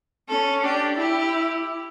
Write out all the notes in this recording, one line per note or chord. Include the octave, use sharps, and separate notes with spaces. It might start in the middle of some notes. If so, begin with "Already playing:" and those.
C#4 A4
D4 G4
E4 G4